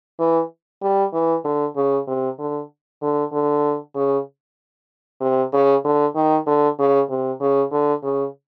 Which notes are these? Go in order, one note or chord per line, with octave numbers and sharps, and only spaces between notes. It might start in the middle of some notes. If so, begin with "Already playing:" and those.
E3
G3
E3
D3
C#3
C3
D3
D3
D3
C#3
C3
C#3
D3
D#3
D3
C#3
C3
C#3
D3
C#3